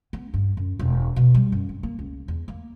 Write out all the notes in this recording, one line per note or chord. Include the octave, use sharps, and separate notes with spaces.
B3
G2
F#2
E1
B2
G3
F#2
C4
A#3
C#2
E2
A#3